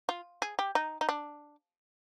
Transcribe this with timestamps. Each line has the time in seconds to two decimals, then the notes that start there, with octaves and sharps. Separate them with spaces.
0.09 F4
0.42 G#4
0.59 G4
0.75 D#4
1.01 D#4
1.09 D4